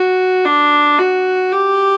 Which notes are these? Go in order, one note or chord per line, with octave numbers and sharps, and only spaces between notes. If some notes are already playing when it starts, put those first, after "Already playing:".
Already playing: F#4
D4
F#4
G4